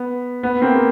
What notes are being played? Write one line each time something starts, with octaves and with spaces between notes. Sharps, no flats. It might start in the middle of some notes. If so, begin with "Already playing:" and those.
Already playing: B3
B3
A#3 C4
A#3